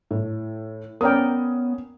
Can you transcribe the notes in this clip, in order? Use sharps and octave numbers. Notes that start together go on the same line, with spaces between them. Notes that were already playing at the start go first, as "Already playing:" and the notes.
A2
B3 C#4 A#4 D5 G5 D#6